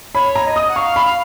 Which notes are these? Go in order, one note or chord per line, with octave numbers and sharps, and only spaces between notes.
C#5 B5
A#5
D#5
D#6
F#5
F5 C#6
B5
F5